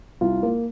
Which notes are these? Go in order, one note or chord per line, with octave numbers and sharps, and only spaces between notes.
C2 F4
A#3